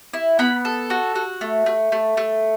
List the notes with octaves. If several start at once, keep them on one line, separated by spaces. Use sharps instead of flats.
E4
B3 B5
A4
F#4
F#4
A3
A3
A3
A3